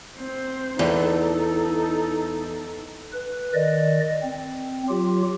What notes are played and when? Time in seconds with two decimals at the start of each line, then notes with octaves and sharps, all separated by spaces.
0.16 C4 C5
0.79 E2 D#4 A4
3.12 B4
3.54 D#3 D5 D#5
4.23 C4
4.88 F#3 F4 G4